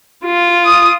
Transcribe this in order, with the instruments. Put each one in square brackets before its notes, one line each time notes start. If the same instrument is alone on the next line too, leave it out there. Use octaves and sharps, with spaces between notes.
[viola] F4
[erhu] D#6